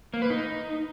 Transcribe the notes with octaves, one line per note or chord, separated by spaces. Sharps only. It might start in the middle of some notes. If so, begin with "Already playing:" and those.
A#3
B4
D#4